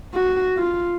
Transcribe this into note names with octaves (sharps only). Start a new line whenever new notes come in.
F#4
F4